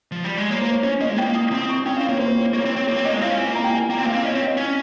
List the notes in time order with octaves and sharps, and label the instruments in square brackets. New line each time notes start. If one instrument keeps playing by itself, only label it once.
[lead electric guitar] F3
G3
G#3
[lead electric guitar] A#3 [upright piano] C#5
[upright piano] C5
C#5
[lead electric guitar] C#4 [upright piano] C#5
[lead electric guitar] A#3 [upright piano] D#5
[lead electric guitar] G#3
[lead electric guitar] A#3 [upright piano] G5
[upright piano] D#6
[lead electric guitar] C4 [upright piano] D#6
[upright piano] C#6
[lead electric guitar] C#4 [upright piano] G5
[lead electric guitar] C4 [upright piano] F5
[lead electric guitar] A#3 [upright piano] C#5
[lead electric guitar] A#3 [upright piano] C5
[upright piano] C#5
[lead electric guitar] A#3 [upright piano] C#5
[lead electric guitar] C4
[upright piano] C#5
[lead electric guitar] C4
[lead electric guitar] A#3 [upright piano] C#5
[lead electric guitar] C4
[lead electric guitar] A#3 [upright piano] D#5
[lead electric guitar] G#3
[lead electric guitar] C4 [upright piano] F5
[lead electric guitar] C#4
[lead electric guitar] C4 [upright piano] G#5
[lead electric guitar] A#3
[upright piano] A#5
G5
G#5
[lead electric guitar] A#3 [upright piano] G5
[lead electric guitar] C4
[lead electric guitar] A#3 [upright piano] F5
[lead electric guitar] C4
[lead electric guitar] C#4 [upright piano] D#5
[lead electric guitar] C4 [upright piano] C#5
[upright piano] D#5
[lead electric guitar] C#4